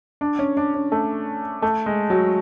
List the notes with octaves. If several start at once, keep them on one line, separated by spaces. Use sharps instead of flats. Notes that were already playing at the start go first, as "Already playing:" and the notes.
D4
C#4
D4
C#4
A3
A3
G#3
F#3